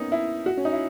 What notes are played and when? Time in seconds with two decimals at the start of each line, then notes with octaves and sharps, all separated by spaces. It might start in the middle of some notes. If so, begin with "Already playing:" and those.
Already playing: A#3 B3 C#4 D#4
0.12 E4
0.46 F#4
0.57 C#4
0.65 D#4
0.73 E4